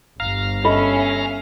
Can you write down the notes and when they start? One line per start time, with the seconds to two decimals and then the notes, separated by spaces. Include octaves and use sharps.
0.20 G1 F5 A#5 F6
0.64 C#4 A4 D#5 E5 B5